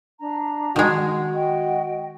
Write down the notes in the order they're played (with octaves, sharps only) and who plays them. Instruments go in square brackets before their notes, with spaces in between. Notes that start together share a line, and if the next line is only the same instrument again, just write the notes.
[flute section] D4 A#5
[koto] D#3 G#3 [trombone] F#4
[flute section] D#5 G5